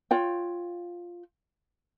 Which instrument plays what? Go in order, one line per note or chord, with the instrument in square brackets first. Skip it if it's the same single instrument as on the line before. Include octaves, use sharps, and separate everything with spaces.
[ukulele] F4 C#5 G5